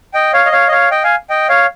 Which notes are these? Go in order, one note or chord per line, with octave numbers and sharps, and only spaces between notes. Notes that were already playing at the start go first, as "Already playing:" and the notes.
D#5 G5
C#5 F5
D#5
C#5 F5
D#5
C#5 F5
D#5 G5
F5 G#5
D#5 G5
C#5 F5